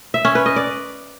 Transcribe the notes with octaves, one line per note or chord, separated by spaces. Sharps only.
E5
C#4
B4
D#5
D5